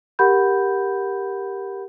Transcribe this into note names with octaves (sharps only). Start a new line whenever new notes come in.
G4 A#4 F#5 B5 G6